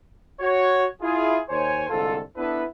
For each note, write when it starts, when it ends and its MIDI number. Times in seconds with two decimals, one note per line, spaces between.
0.40 0.85 66
0.40 0.85 73
1.02 1.37 64
1.02 1.37 65
1.02 1.37 68
1.49 1.84 39
1.49 1.84 72
1.49 1.84 73
1.49 1.84 80
1.89 2.18 36
1.89 2.18 44
1.89 2.18 50
1.89 2.18 65
1.89 2.18 69
2.36 2.63 59
2.36 2.63 62
2.36 2.63 64
2.36 2.63 69
2.36 2.63 71